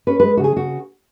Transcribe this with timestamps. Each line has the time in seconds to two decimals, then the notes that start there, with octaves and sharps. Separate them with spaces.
0.07 C#4 B4
0.20 G#3 B4
0.37 F#4
0.40 C#3 G#4
0.56 C#3 F#4